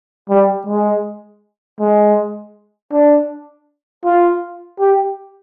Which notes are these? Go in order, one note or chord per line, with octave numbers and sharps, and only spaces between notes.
G3
G#3
G#3
D4
F4
G4